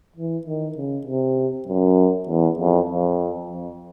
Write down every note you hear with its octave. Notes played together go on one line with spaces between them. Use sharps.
E3
D#3
C#3
C3
F#2
E2
F2
F2
F2